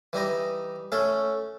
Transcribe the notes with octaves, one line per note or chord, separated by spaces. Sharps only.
E3 G3 D#4 D#5
A3 C#4 A4